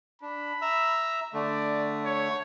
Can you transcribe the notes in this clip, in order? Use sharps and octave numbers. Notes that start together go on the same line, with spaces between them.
D4 B5
E5 A#5 E6
D3 A3 D5
C#5